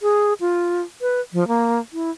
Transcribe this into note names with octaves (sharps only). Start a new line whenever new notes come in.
G#4
F4
B4
F3
A#3
E4